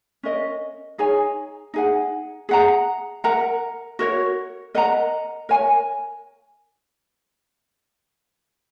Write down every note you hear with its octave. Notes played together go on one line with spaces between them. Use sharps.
C#4 A#4 D#5
D#4 G#4 C#5 G#5
D#4 G#4 F#5
G#4 F#5 A#5
A#4 F#5 A#5
F#4 A#4 C#5
A#4 D#5 F#5 A#5
A#4 C#5 G#5